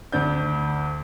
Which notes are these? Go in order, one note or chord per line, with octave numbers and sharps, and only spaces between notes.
D2 D4 G6